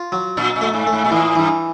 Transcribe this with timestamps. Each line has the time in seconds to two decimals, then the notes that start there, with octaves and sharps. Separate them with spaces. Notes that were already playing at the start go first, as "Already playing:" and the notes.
Already playing: F4
0.12 F#3
0.37 A#2 D4
0.56 A#2
0.61 A3
0.74 G#2
0.87 A3
0.93 G#2
1.04 A#2
1.11 A2 E3
1.36 G2 E3